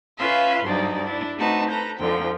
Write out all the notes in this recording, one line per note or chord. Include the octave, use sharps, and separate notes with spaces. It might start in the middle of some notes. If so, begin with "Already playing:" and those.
C#4 F4 B4 E5 F5 C6
D2 G2 F#3 D#4 D5
D4 E4
A3 C4 D#4 F#4 B4 A5
A4 B4 A#5 G6
F2 G#2 D3 F3 G5